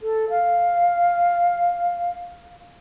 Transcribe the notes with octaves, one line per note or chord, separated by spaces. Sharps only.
A4
F5